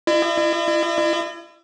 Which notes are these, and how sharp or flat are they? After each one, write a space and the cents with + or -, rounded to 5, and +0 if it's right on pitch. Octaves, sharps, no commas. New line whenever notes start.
E4 +35 D#5 -40